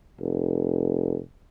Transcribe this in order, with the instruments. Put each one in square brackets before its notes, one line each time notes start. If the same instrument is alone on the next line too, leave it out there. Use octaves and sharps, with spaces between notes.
[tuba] F1